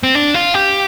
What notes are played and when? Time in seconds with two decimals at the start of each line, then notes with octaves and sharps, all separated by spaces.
0.03 C4
0.15 D4
0.34 F4
0.54 G4